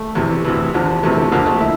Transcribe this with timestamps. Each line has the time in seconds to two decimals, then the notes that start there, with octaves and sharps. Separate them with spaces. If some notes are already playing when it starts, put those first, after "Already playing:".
Already playing: A3
0.15 E2 C3 E3
0.45 D2 C3 E3
0.74 E2 D3 F3
1.03 E2 C3 E3 A3
1.17 A3
1.32 D2 D3 F3 A#3
1.46 A3
1.60 E4